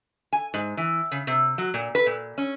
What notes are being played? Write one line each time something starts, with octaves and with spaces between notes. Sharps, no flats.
G#5
G#2
E3
C#3
C3
F#3
A#2
B4
A#2
C#4